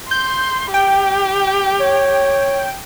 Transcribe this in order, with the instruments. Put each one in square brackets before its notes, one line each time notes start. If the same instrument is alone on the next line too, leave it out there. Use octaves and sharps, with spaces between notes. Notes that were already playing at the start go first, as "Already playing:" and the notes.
[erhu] C6 [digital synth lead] G6
[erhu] G4 [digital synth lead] G5
[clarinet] C#5